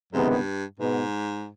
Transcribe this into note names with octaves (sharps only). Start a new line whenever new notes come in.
C#2 F#2 C3 D#3 G#3 B3
G2
G#2 B2 G#3 B3